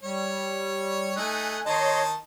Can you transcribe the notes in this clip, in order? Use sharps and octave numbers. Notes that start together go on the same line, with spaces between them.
G3 C#5
A3 D#4 G#5 F#6
D#3 D#4 C#5 D#5 A5 C6